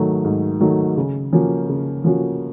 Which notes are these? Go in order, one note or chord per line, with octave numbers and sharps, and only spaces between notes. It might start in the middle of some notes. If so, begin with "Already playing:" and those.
Already playing: G#2 D#3 F#3 A3
G#2
D#3 F#3 A3
C#3
F3 A#3 C#4 F#4
C#3
F3 A#3 C#4 F#4